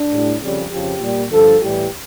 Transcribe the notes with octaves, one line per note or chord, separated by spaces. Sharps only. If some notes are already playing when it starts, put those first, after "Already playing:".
Already playing: D4
A2 G3
F2 C#3 G3
F2 C#3 F3 G4
A#2 G3
G2 D3 F3 A4
A2 E3 G3 G4